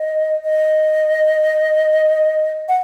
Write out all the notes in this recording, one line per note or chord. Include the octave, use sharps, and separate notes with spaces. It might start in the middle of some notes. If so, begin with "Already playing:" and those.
Already playing: D#5
D#5
F#5